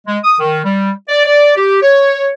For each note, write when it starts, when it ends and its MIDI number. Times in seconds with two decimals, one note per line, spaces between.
0.06 0.19 56
0.24 0.36 87
0.40 0.60 51
0.64 0.91 55
1.09 1.23 74
1.26 1.53 74
1.57 1.80 67
1.82 2.30 73